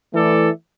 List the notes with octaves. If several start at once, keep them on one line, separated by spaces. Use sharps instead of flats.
E3 A3 E4 A4 D5